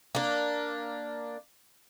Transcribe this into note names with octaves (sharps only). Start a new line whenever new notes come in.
A#3 D4